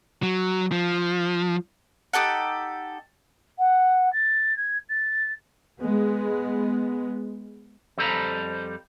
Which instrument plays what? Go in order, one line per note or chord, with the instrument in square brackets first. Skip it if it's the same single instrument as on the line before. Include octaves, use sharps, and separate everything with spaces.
[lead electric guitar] F#3
F3
[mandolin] D#4 G4 A4 F#5
[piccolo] F#5
A6
G#6
A6
[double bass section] G#3 B3
[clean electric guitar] F2 G3 A4 C5 A#5 B5